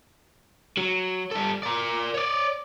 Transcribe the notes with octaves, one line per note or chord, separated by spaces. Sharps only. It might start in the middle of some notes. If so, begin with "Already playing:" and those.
F#3
G3 A4
A#4 D5
C#5 D5